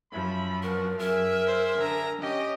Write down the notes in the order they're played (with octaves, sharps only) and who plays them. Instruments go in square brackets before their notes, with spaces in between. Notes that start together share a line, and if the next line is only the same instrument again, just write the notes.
[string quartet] F#2 F3 [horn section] E5 B5
[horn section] B3 C4 F#4 [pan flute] A#4
[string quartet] F#2 [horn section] G#4 E5 [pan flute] A#4
[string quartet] C5
D3 A#5
[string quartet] C#4 G4 [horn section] D#5